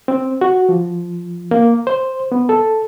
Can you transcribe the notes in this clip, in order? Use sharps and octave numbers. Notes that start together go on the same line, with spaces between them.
C4
F#4
F3
A#3
C5
B3
A4